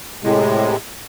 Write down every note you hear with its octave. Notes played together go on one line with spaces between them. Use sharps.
A2 C3 G#3